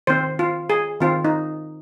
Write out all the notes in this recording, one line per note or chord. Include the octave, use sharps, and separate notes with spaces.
D#3 C4 C5
F4
G#4
D#3 C4 F4
D#4